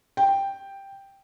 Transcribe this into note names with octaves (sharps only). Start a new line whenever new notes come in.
G5